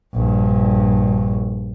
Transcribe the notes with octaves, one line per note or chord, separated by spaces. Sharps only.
A#1 G2